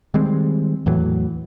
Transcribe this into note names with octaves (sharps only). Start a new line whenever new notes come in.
D#3 G3 G#3 C4
E2 A2 E3 F#3